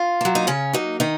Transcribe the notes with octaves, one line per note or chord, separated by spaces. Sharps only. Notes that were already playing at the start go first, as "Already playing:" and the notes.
Already playing: F4
F#3 A#3
D#4
C#3 C#4
F#3 A#3 D#4
D#3 D#4